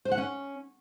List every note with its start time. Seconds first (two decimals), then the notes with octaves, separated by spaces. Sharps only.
0.05 C5
0.12 F#5
0.18 C#4